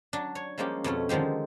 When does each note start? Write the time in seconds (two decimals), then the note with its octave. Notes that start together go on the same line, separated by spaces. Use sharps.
0.13 F#3 D4
0.35 C#5
0.58 F3 G3 G#3 A#3 C#4 G4
0.84 F2 B2 A3 C#4
1.09 D3 D#3 F3 G#3 G4